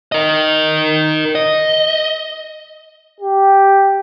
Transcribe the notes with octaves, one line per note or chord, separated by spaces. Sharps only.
A#4 D#5
D#5
G4